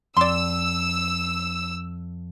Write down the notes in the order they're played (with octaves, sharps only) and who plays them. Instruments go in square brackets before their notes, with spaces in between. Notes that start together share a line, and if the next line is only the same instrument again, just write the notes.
[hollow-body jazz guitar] F2 [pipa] D5 C6 [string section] E6